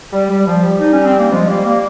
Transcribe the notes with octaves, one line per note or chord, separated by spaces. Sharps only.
G3
G3
F3
G3
D#4
C#4
C4
A#3
F3 G#3
G3 A#3
G3 A#3